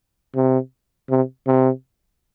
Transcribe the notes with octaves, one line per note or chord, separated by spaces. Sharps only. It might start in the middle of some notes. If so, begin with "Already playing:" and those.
C3
C3
C3